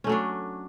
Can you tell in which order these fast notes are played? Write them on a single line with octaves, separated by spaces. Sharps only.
C#4 A3 F#3 D4